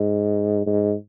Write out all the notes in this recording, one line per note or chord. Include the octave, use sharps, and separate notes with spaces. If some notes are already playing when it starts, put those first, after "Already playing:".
Already playing: G#2
G#2